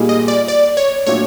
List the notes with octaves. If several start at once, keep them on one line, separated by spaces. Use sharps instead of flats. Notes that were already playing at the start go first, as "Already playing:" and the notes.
Already playing: A#2 G3 A#3 D#4 G#4
D#5
D5
D5
C#5
A#2 F#3 A3 D4 C#5